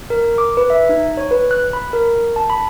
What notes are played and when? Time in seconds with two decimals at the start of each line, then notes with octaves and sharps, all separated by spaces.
0.10 A#4
0.38 D6
0.57 B4
0.70 E5
0.89 D#4
1.17 C#5
1.31 B4
1.51 F#6
1.73 B5
1.93 A#4
2.36 A5
2.50 B5